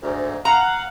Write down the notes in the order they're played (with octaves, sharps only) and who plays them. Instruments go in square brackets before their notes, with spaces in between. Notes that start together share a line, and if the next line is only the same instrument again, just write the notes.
[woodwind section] D2 G#2
[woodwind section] F5 F#5 [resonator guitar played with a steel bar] A#5